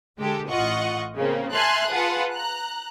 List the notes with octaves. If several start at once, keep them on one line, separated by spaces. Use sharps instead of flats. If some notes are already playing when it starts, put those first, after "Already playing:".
D3 G#3 G4 A4
A1 F4 D#5 F#5 C#6
C#3 A#3 C4
E5 G#5 A5 C6 F6 F#6
F4 G#4 B4 F#5 A5
A#5 F#6